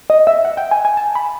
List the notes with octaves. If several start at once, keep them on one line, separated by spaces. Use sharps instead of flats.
D#5
E5
F#5
G5
G#5
G#5
A5
B5